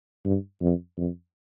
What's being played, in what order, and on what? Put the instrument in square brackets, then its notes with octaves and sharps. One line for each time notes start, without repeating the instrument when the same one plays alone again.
[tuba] G2
F2
F2